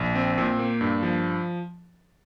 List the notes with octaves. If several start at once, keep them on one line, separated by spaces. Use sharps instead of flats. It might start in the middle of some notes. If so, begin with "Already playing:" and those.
Already playing: A#1
C4
A#2
A#3
G2
F3